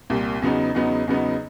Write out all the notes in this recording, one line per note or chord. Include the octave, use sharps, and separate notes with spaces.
C2 A#2 G3
E2 C#3 F#3 B3 D#4
E2 C#3 F#3 B3 D#4
E2 C#3 F#3 B3 D#4